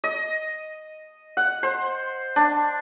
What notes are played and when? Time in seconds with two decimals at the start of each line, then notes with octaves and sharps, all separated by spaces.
0.04 D#5
1.37 F#5
1.63 C5
2.36 D4